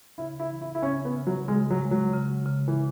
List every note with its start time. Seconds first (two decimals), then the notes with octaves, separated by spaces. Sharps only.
0.18 C#3 E4
0.40 E4
0.50 E3
0.61 E4
0.75 E4
0.82 C#3 C#4
1.05 B3
1.16 C#3
1.27 F#3
1.48 C#3 G#3
1.70 F#3
1.82 G#3
1.91 F#3
2.14 C#3
2.46 C#3
2.68 E3